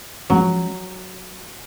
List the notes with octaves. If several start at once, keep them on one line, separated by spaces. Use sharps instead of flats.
F3 F#3 G#3 C#4